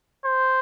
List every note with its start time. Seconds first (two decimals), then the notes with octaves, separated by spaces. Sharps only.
0.25 C5